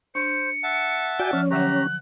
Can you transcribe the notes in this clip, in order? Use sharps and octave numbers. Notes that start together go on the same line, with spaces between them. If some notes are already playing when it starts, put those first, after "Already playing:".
D4 C5 C#7
E5 F#5 A5
F#4 D5 G5 G#5
F3 C#4 F6
D3 F#3 G4 F#5 A#5 F#6